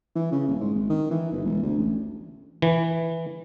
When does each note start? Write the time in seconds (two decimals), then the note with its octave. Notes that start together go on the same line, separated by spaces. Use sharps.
0.15 E3
0.32 C#3
0.48 D#1
0.60 G#2
0.74 G#1
0.89 D#3
1.11 E3
1.32 G1
1.44 E1
1.62 D2
1.78 A1
2.62 E3